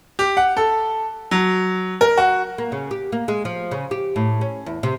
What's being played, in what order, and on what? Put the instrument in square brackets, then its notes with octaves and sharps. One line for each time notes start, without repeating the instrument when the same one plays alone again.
[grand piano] G4
F#5
A4
F#3
A#4
F#4
[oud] A#3
C#3
G4
A#3
G#3
F3
C#3
G4
A2
C#4
E2
C3